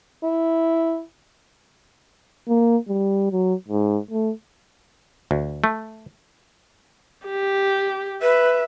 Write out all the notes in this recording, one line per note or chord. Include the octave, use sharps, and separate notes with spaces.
E4
A#3
G3
F#3
G#2
A3
D2
A3
G4
B4 E5